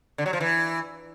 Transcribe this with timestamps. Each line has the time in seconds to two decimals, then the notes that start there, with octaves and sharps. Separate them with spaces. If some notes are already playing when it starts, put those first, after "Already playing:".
0.18 D3
0.26 F#3
0.33 F3
0.40 E3